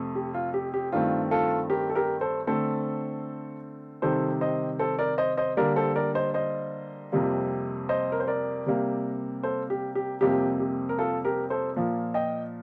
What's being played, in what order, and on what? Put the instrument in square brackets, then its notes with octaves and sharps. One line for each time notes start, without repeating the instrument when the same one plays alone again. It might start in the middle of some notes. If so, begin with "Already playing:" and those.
Already playing: [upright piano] F2 C3 A3
G4
F4
G4
G4
G2 D#3 A3 C4 F4
F4 A4
G4 A#4
A4
G4 A#4
A4 C5
D3 A3 C4 A4 C5
C3 D#3 G3 A4 C5
C5 D#5
A4 C5
A#4 D5
C5 D#5
C5 D#5
D3 G3 A#3 A#4 D5
A4 C5
A#4 D5
C5 D#5
C5 D#5
F2 C3 G3 A#3
C5 D#5
A#4
C5
A#4 D5
C3 G3 A#3
A4 C5
G4
G4
F2 C3 G3 A#3 G4
G4
A#4
F4 A4
G4 A#4
A4 C5
A#2 F3 A#3
D#5 G5